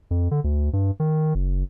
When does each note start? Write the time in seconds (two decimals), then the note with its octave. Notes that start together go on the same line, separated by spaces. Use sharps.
0.11 F2
0.31 D3
0.44 D2
0.73 G2
1.00 D#3
1.35 F#1